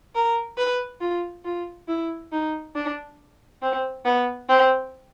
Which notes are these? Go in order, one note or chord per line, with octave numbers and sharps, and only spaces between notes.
A#4
B4
F4
F4
E4
D#4
D4
C4
B3
C4